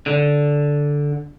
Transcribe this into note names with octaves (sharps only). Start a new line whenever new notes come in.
D3